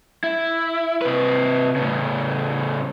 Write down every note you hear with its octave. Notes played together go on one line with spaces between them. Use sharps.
E4
C3 B4
A2 C#3